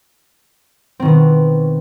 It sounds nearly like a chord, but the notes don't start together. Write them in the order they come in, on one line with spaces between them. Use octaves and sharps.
C4 D#3 B2 B3